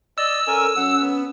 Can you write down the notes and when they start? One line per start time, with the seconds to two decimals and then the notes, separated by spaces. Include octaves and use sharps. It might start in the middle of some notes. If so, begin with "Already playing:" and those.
0.18 D5 D#5 E6
0.47 C#4 A4 A#4 G#5
0.77 F#3 C#4 F#5
1.01 B3